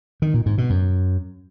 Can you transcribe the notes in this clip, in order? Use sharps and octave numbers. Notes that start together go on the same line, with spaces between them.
D#3
A#2
G#2
B2
F#2